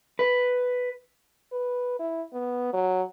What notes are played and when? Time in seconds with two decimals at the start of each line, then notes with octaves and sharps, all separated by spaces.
0.19 B4
1.52 B4
1.99 E4
2.33 B3
2.73 F#3